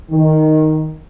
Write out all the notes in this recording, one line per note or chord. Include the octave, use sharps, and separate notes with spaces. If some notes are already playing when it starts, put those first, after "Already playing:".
D#3